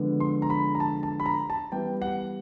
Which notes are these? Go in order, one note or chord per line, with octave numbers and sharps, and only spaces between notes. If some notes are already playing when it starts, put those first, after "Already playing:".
Already playing: D3 F3 G#3 B3 D4
C6
A#5
B5
A#5
A5
A5
B5
A#5
A5
E3 G3 B3 E4 G5
F#5